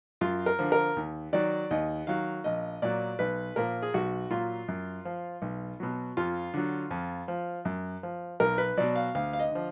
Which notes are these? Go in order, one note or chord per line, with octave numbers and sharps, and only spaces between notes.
F#2 F4
A#4
D3 F3
A#4
D#2
D#3 F#3 D5
D#2 D#5
D#3 F#3 F5
A#1 D#5
A#2 F#3 D5
B1 B4
A#2 F3 A#4
G#4
B1 F#4
A#2 F#3 F4
F#2
F3
B1
B2 F#3
F2 F4
D3 F#3
F2
F3
F#2
F3
B1 A#4
B4
B2 F#3 D5
F5
D2 F5
F5
D#5
D3 F3